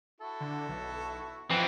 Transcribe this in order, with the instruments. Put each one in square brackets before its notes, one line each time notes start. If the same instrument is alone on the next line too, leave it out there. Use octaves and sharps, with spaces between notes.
[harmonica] E4 F#4 A4
[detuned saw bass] D3
B1
[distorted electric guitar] E3 C4 [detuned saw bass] F3 [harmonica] F#5